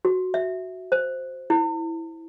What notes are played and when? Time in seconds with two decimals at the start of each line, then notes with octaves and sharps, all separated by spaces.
0.05 F#4
0.34 E5
0.92 C5
1.50 E4